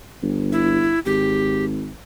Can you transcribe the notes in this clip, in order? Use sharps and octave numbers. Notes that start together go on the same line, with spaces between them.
G1
E4
G#1 G4